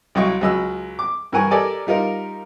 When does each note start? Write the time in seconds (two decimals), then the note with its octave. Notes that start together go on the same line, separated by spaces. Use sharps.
0.15 C2 F#3 D#5 F5 G5 C#6
0.41 C#2 F#3 D#5 B5 E6
0.99 D6
1.32 G2 E3 A#4 F#5 G#5 C#6
1.51 G4 A4 A#4 D5 D#5 G#5
1.87 G3 D#4 F4 A#4